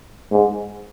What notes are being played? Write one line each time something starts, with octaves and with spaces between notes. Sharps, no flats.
G#2